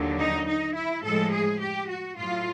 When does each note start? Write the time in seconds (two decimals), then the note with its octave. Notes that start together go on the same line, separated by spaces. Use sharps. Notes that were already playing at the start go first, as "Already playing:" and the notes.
Already playing: D#2 D3 F#3
0.19 D#4
0.47 D#4
0.75 E4
1.03 A2 F3 G#3 A4
1.32 G#4
1.60 G4
1.88 F#4
2.16 A2 F#3 F4